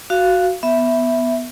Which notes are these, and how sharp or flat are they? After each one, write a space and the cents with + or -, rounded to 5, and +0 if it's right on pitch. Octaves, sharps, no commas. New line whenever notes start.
F#4 +0 F5 -10
B3 +0 E5 +0